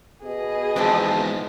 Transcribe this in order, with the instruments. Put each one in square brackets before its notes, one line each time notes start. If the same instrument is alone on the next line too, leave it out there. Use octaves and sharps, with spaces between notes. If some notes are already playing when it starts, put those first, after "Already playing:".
[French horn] B2 [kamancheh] G#4 D#5
[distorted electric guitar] E2 G#2 [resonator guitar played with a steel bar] F3 B3 C4